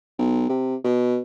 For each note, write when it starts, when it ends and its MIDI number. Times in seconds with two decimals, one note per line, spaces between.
0.19 0.49 35
0.50 0.76 48
0.85 1.19 47